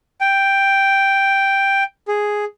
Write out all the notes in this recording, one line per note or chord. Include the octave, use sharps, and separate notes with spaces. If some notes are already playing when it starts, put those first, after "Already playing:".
G5
G#4